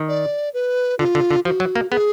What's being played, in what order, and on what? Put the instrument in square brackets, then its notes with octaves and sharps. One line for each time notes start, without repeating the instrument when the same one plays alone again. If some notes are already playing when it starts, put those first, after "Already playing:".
Already playing: [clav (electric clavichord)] D#3
[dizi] D5
B4
[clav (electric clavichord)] D3 [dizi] F4
[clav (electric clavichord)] D3
D3
[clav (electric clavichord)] F3 [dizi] F#4
[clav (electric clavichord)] F#3
A#3
[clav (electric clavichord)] B3 [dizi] G#4